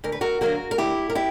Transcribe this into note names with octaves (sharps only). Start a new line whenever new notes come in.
D2 A#4
B4
F#4 A#4
D3 F#3 A#3 F#4 A#4
A#4
D2 E4 G4
A#4
E4 G4